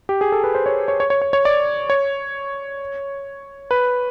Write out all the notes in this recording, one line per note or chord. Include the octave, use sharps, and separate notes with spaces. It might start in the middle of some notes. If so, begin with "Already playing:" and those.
G4
G#4
A4
B4
C5
C#5
C#5
C#5
C#5
C#5
C#5
D5
C#5
B4